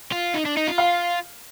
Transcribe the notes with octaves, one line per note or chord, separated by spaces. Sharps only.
F4
D#4
D4
D#4
F4
F5